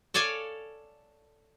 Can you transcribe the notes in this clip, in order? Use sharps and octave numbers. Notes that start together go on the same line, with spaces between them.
A4 C#5 D5 F5 G#5